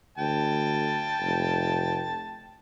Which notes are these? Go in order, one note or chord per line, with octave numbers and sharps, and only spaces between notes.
D2 G5 A5
F1